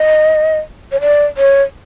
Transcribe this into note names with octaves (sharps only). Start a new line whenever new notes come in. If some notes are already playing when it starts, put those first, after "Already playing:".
Already playing: D#5
C#5
D5
C#5